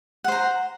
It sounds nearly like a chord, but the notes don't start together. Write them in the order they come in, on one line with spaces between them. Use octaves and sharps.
F#5 C5 A#5